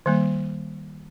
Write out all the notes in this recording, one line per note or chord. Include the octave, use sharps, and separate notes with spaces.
D#3 G3 A#3